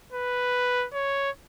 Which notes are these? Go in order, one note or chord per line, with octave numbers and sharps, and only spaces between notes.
B4
C#5